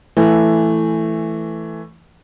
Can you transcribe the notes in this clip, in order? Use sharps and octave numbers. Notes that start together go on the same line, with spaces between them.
E3 A3